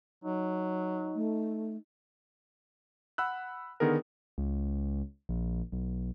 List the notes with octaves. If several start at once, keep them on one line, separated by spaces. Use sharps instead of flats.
F#3 D#4
A3
F#5 B5 E6 F#6
D3 D#3 B3 G#4 A#4
C#2
A#1
B1